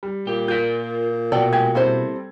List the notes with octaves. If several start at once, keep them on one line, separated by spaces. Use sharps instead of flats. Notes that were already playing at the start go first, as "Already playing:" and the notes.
G3
A#2 G4
F4 A#4 G6 B6
B2 F#4 A4 D5 G5
G#3 G4 G#6
G3 A#3 C4 E4 A4 C5